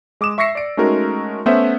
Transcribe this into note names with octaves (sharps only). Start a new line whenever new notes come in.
G#3 D6 D#6 E7
E5 C#6 E6 A#6 C7 C#7
D5 D7
G#3 A3 C#4 D#4 F#4 A#4
A3 B3 C#4 C5 E5 F#5